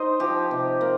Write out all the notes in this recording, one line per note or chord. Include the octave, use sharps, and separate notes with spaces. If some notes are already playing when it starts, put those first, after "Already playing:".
Already playing: D#4 C5 D#5
F3 G4
C3
A#3